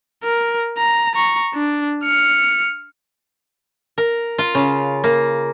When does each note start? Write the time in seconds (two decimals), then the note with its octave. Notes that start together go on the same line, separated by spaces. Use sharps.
0.24 A#4
0.78 A#5
1.15 A#5 C#6
1.55 D4
2.04 F6 C#7
3.98 A#4
4.38 F4
4.55 C#3
5.04 A#3